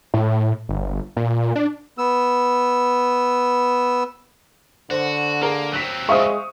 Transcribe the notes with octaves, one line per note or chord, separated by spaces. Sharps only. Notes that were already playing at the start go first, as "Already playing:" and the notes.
A2
G1
A#2
D4
B3 E6
D3 F#4 C5
A#3 G#4 A#4
F#3 C4 F#6 B6
G#3 C5 E5 F5 C#6 D#6